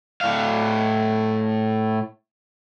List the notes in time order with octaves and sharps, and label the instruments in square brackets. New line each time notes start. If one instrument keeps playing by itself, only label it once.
[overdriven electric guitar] A2 F5